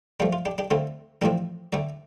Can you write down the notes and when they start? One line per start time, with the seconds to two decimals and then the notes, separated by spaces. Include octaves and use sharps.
0.20 G2 F3 A3 D4 G4
0.33 F4
0.46 D4 G4
0.58 D4 G4
0.71 D2 D3 A3 C4 F4
1.22 A1 A2 F3 C4 D4 G4
1.73 D2 D3 A3 D5 G5